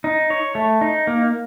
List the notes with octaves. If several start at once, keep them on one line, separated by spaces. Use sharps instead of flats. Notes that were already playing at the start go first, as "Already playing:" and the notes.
D#4
C#5
A3
D#4
A#3